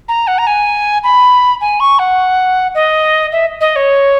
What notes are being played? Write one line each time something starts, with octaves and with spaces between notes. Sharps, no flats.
A#5
F#5
A#5
G#5
B5
G#5
C#6
F#5
D#5
E5
D#5
C#5